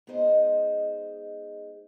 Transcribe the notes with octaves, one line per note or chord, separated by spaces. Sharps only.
G#3 B3 D#4 G#4 C5 D#5